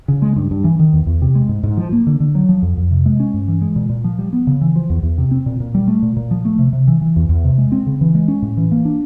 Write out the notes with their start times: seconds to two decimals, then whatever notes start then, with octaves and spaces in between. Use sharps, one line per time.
0.08 C#3
0.22 G#3
0.36 G2
0.51 G2
0.64 E3
0.79 D#3
0.93 E2
1.06 E2
1.22 C3
1.35 G#3
1.49 G#2
1.63 G#2
1.77 F3
1.92 A#3
2.07 D3
2.20 D3
2.35 F#3
2.49 F3
2.62 F2
2.77 F2
2.91 C3
3.06 G#3
3.20 C#4
3.34 G2
3.48 E3
3.62 G#3
3.76 A#2
3.89 A#2
4.04 F3
4.19 G3
4.33 B3
4.47 C#3
4.61 E3
4.76 F3
4.90 E2
5.03 E2
5.18 C3
5.31 C4
5.46 A#2
5.60 A#2
5.75 G3
5.88 A3
6.02 A#2
6.17 A#2
6.31 F3
6.45 A3
6.59 C3
6.73 C3
6.88 E3
7.01 E3
7.16 E2
7.29 E2
7.44 C3
7.58 G#3
7.72 C4
7.87 C#3
8.01 E3
8.15 G#3
8.28 C#4
8.42 A2
8.57 E3
8.71 A#3
8.85 D4